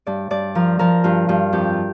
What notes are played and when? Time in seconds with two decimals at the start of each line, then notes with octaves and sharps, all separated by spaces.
0.07 G2 D5
0.30 G2 D5
0.55 F3 A#4
0.79 F3 A#4
1.04 G2 F4
1.29 G2 F4
1.53 F2 G4